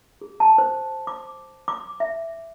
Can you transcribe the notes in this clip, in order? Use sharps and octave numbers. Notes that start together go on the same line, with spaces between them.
G#4
A5
C5
D6
D6
E5